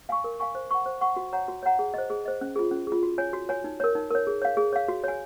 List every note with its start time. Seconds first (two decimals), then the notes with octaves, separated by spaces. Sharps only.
0.09 F5 G#5 C#6
0.24 A#4
0.40 F5 G#5 C#6
0.55 C5
0.71 F#5 C#6
0.86 C5
1.01 F#5 C#6
1.16 F#4
1.33 C#5 F#5 A#5
1.48 F#4
1.63 C#5 F#5 A#5
1.79 G#4
1.94 C5 D#5
2.10 G#4
2.25 C5 D#5
2.41 C#4
2.56 F4 G#4
2.71 C#4
2.87 F4 G#4
3.03 F#4
3.18 C#5 G#5
3.33 F#4
3.49 C#5 G#5
3.64 D#4
3.80 A#4 C#5
3.95 D#4
4.11 A#4 C#5
4.27 G#4
4.42 C#5 F5
4.57 G#4
4.73 C#5 F5
4.88 F#4
5.04 C#5 G#5